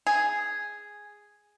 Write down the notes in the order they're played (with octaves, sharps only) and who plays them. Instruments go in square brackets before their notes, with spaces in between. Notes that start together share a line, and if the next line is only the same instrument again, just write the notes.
[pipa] G#4